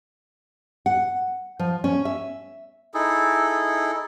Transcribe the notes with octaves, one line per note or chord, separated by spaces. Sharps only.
F#5
F3
C#4
E5
D#4 E4 G#4 A4